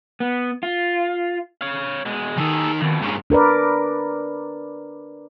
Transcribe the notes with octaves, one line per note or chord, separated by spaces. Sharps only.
B3
F4
C#5 F5
B2 G#3
D#2 D#3 G#4 A4
F2 B2
G2 A#2 G#3 C#4
D4 A#4 B4 D5